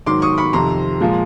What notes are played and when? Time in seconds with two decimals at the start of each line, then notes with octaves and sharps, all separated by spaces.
0.06 G#2 D#3 F#3 C6 D6
0.22 C#6 D#6
0.38 B5 C#6
0.53 F2 C3 D#3 A#5 C6
1.00 A#2 F3 G#3